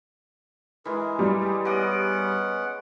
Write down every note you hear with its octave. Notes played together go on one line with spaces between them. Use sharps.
E3 G#3 G#4 A#4
G3
G4 G#4
B3 C#4 D#5 F#5 D6